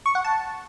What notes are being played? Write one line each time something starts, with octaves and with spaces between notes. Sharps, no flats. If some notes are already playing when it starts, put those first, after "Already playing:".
C#6
F#5
A5